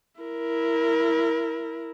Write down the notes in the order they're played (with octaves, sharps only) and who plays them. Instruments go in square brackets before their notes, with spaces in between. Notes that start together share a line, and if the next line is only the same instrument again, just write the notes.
[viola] E4 A#4